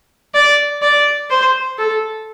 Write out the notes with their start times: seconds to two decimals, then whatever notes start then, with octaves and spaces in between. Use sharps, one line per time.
0.34 D5
0.82 D5
1.30 C5
1.78 A4